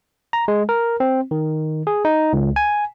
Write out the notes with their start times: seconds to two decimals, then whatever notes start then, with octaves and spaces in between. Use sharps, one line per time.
0.33 A#5
0.48 G#3
0.69 A#4
1.00 C4
1.31 D#3
1.87 G#4
2.05 D#4
2.33 C#2
2.56 G#5